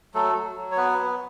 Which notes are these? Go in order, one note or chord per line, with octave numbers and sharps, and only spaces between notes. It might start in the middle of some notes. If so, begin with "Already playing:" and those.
F#3 A3 A4
F#3
F#3
C#5
B3 B4
B3